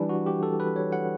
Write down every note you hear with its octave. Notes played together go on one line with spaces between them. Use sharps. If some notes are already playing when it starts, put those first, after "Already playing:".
Already playing: E3 G3 D4
F#4
G4
A4
B4
C#5
F#5